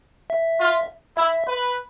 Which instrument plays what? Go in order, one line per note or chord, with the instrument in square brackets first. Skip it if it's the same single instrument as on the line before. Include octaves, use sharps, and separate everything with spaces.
[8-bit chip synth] E5
[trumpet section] F4
[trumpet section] E4 [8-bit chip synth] E5
[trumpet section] B4